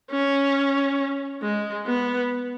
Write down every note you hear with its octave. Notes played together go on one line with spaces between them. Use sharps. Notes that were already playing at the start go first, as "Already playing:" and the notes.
C#4
G#3
B3